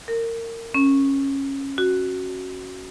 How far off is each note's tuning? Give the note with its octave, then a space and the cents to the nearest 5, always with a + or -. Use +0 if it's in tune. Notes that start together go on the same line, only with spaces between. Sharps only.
A#4 -25
C#4 -15
F#4 +5